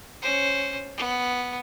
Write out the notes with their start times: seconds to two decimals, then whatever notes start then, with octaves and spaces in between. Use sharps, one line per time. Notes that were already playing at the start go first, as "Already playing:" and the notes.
0.22 C#4 C5
0.97 B3